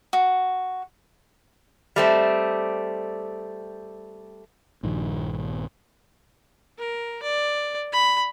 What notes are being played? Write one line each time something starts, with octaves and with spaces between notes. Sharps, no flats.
F#4
G3 A3 C4
A#1 G2 D#3 F3
A#4
D5
B5